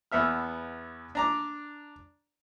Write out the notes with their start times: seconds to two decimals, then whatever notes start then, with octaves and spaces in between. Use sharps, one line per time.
0.12 E2 B3 E5 F6
1.15 D4 A#5 D6